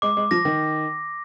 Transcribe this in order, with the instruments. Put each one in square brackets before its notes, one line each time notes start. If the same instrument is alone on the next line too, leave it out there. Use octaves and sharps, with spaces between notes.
[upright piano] G#3 [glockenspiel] D6
[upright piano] G#3
[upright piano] F3 [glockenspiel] A#6
[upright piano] D#3